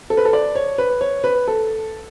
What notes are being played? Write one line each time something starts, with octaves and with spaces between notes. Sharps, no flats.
A4
B4
A4
D5
C#5
B4
C#5
B4
A4